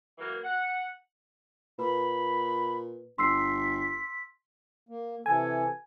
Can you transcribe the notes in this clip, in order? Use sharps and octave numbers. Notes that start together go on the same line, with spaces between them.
E3 F#3 A#3
F#5
A#2 B4 B5
G1 C6 E6 B6 C7
A#3
C3 E3 A4 G#5